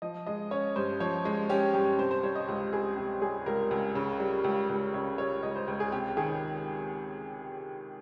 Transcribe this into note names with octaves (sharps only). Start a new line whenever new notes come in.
F3 D#5
G#3 D#5
C#4 C#5
G2 C5
F3 C#5
G#3
C#4 G4
G2 G4
C3 C5
C5
G3 C#5
D#5
C#2
C#2 G#4
C3 G4
G3 G#4
C#2 A#4
C#2
C#3
G3
C#2
C#2
C#3 C#5
G3 C#5
C#2 D#5
C5
C#2
G#4
C3 G4
D#3 G#4